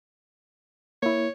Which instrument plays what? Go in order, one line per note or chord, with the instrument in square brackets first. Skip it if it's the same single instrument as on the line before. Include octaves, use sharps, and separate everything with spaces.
[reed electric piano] A#3 E4 [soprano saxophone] C#5